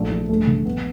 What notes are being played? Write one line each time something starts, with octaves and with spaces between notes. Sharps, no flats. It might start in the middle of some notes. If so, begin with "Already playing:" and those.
Already playing: A#1 A3
A#1
G2 A3
D3
A#1 B3